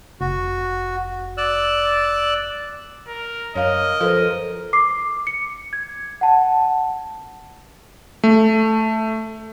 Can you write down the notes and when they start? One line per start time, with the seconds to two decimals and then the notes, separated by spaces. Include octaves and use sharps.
0.21 F1 F#4
1.38 D5 E6 F#6
3.07 A#4
3.56 F#2 A#4 C#5 D#5 F5
4.01 F3 A4 B4 C5
4.73 D6 C7
5.27 C#7
5.73 G#6
6.21 F#5 A5
8.24 A3